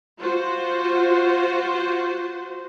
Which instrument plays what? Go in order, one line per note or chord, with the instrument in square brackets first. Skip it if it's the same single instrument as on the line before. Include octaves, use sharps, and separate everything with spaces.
[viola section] F4 F#4 C5